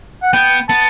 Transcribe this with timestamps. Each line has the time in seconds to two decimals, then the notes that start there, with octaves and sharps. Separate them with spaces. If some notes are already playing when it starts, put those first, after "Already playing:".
0.23 F#5
0.33 B3 G5
0.69 B3 A5